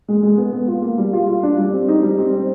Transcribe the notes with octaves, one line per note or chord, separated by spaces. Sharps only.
G#3
G#3
B3
B3
F4
A#3
G3
F4
F4
D4
G3
C4
D#4
G3
C4
C4